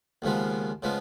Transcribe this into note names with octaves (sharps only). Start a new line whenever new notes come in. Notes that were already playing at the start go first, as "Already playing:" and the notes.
D#2 C#3 F3 G#3 B3
C#3 F3 G#3 B3